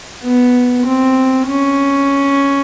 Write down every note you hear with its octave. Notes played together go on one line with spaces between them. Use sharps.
B3
C4
C#4